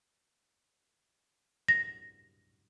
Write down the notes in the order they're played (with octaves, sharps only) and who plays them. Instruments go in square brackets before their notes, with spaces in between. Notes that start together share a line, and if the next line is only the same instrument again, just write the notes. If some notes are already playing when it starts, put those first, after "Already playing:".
[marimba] A#6